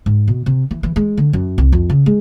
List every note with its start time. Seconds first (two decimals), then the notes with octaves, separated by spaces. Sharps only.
0.06 G#2
0.28 B2
0.46 C3
0.71 E3
0.83 E3
0.96 G#3
1.17 D3
1.33 F#2
1.58 C2
1.72 F2
1.90 C#3
2.06 G#3